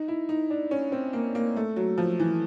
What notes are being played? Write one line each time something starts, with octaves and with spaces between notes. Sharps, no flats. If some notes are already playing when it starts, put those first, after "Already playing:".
Already playing: D#4
E4
D#4
D4
C#4
C4
A#3
A#3
A3
F#3
F3
E3